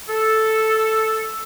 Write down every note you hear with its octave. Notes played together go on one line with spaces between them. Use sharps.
A4